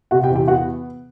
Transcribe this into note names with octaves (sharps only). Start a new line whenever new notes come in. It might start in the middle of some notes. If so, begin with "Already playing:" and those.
C3 F#4 F#5
G4 G5
E2
G4 G5
B3 F#4 F#5